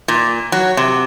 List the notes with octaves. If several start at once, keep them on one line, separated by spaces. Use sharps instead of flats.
A#2
F#3
C3